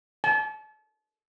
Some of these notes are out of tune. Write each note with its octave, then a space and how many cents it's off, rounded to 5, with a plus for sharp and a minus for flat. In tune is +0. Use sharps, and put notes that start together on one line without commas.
A5 -35